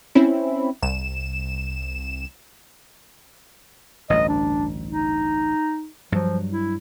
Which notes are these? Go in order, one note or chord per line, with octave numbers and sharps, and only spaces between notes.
C4 C#4 E4
C2 E7
A1 D2 G2 D#5
D4
D#4
G2 F3 F#3
E4